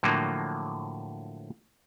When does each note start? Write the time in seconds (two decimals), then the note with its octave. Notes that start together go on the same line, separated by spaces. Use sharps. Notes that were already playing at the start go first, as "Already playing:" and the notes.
0.03 A2 D3 F3 F#3 A#3